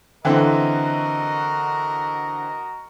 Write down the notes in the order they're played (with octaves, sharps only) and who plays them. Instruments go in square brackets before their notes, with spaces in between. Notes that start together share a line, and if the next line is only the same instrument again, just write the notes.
[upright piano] D3 E3 C4 [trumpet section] F#4 A#4 D#5